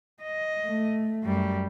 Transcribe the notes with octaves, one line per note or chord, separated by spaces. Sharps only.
D#5
A3
F#2 G3